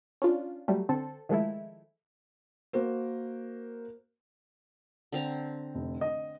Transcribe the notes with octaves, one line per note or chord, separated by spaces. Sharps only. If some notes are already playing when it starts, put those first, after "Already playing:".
C#4 D4 F4
F#3 G3 A3
D3 C4 A4
D#3 F3 G#3 A3 E4
A#3 F#4 A#4 C5
D3 C4 A#5
F1
D#5